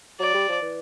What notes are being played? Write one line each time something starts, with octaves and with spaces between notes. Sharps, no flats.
F#3 D5
G3
F3
E3